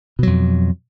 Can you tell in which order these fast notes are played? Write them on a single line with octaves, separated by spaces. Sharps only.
B2 F#3 F2